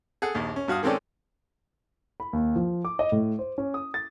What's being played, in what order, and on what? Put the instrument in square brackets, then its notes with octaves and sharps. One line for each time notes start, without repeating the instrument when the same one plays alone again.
[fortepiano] G#4 A4 F#5
A#1 D#2
C#4
G2 F#4 F5 D#6
D#3 G#3 C4 C#4 A4 D5
[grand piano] B5
D#2
F3
D6
D#5
A2
C5
C#4
D#6
A6